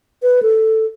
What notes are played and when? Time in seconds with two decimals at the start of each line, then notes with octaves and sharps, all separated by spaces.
0.22 B4
0.43 A4